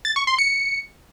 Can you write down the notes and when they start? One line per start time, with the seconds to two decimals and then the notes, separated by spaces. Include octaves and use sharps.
0.05 A6
0.16 C#6
0.27 C6
0.38 C#7